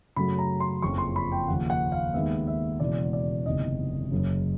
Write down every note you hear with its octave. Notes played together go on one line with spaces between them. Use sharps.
F#2 C#3 F#3 A3 B5
A#5
C6
F#1 F2 C#3 F3 C#6
C6
B5
G5
D#2 C#3 F3 A#3 F#5
F#5
F5
D#2 D#3 G#3 B3 E5
E5
E1 E2 C#3 D5
D5
F#1 E2 C3 D#3 D#5
F#1 F#2 C#3